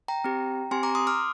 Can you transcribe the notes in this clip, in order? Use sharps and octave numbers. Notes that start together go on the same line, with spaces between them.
G5 A#5
C4 G4
C4 G4 G#5 C6
A#5 D6
C6 D#6
D6 F6